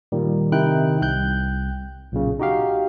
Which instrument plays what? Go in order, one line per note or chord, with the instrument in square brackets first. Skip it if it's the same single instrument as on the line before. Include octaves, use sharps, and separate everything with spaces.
[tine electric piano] A#2 D#3 G3
C3 D#3 D#4 E4 G5 F#6
C2 G5 F#6 G6
B1 A#2 C#3
D#4 F#4 G4 F5